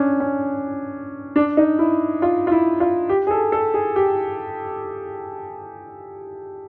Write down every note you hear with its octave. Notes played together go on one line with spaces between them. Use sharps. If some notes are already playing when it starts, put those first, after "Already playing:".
Already playing: C#4 D4
C#4
D4
D#4
E4
F4
F4
E4
F4
G4
G#4
A4
A4
G#4
G4